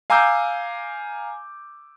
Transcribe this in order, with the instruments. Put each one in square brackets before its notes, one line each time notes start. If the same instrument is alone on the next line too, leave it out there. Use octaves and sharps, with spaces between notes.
[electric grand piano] F5 G#5 A#5 D6 E6 G6